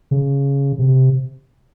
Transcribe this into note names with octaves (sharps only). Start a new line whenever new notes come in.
C#3
C3